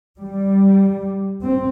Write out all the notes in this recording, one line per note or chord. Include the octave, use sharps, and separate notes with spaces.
G3
C4